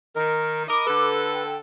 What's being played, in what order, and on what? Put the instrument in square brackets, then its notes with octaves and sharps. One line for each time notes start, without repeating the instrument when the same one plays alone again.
[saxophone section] D#3 [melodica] A#4
[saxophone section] A#4 D#5 [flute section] B5 D6
[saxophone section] D3 A4 [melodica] B4
[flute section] G5